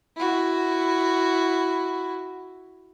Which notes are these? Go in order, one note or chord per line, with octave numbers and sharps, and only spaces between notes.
E4 F#4